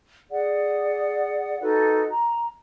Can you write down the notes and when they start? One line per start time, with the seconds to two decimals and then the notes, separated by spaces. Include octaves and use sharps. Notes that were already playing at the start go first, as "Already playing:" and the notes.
0.30 G#4 D5 F#5
1.61 D#4 F#4 A4 B4
2.09 A#5